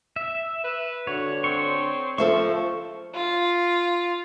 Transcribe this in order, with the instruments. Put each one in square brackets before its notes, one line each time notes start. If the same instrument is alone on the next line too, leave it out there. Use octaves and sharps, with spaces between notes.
[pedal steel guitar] E5
[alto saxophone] B4
[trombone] D3 [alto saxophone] F#4 [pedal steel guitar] C#5
[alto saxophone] C4 [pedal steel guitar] C#5 C6 C#6
[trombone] F3 [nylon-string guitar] A4 C5 E5 [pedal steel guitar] C#6
[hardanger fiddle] F4